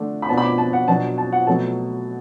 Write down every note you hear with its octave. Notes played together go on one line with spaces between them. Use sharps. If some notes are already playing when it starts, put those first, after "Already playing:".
Already playing: D3 A3 D4
B5
B2 B3 D4 A5
B5
D6
A5
F#5
B2 F#3 D4 A5
A5
F#5
B2 F#3 A3 A5